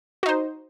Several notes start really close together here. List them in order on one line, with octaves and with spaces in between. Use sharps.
F#4 D#4 C5